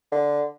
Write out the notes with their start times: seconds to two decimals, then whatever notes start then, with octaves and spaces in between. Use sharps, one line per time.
0.12 D3